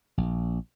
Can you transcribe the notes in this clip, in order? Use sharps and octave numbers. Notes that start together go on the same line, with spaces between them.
A#1